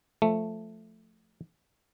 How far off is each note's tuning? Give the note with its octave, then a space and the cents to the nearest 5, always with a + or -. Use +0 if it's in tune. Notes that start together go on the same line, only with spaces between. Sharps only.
F3 +0 A3 +0